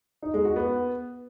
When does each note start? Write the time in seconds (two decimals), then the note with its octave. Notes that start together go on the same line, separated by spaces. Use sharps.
0.23 D#4
0.34 G#3
0.45 F#4
0.56 B3